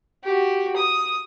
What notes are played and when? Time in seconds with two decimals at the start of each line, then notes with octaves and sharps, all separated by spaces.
0.24 F#4 G4
0.76 D#6